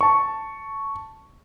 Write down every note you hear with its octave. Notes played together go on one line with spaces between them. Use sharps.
A5 C#6